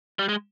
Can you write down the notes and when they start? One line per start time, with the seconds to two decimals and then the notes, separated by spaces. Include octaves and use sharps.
0.19 G3
0.29 G#3